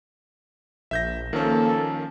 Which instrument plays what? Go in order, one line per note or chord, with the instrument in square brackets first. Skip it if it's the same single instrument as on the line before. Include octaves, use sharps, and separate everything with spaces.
[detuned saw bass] A#1 [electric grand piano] E5 G6 A#6
[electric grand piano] D#3 F3 C#4 [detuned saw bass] A#3 [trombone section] A4